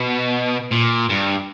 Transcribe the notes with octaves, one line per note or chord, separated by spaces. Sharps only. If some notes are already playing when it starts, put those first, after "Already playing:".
Already playing: B2
A#2
G2